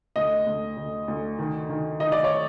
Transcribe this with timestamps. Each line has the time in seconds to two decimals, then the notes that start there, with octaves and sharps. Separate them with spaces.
0.16 D2 D#5
0.47 D2
0.77 D2
1.08 D2
1.39 D#3
1.69 D#3
2.00 D#3 D#5
2.12 D5
2.24 C#5